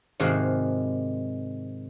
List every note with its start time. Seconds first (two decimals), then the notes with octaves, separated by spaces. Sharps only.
0.20 G#2 C3 D#3 G#3 F#4 F5